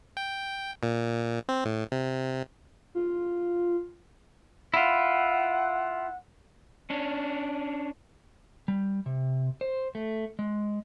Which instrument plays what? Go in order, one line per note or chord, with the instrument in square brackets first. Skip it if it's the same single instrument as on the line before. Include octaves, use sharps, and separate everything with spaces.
[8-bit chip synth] G5
A#2
C4
A2
C3
[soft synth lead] F4
[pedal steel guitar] E4 F4 [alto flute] F#5
[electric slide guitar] C#4 D4
G3
C3
C5
A3
G#3